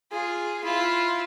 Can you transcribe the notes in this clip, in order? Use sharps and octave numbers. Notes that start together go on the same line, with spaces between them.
F4 G#4
E4 F4